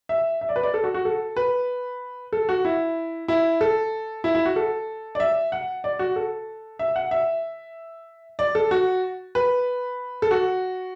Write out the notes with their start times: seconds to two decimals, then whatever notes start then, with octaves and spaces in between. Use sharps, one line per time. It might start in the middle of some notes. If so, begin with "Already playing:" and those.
0.09 E5
0.41 E5
0.49 D5
0.56 B4
0.63 D5
0.74 A4
0.84 F#4
0.94 F#4
1.05 A4
1.37 B4
2.33 A4
2.49 F#4
2.65 E4
3.28 E4
3.61 A4
4.24 E4
4.35 E4
4.45 F#4
4.56 A4
5.15 D5
5.20 E5
5.52 F#5
5.84 D5
5.99 F#4
6.16 A4
6.79 E5
6.96 F#5
7.11 E5
8.39 D5
8.55 A4
8.71 F#4
9.35 B4
10.22 A4
10.31 F#4